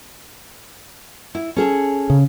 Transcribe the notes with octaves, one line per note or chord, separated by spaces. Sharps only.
E4
C#4 G#4 A4
C#3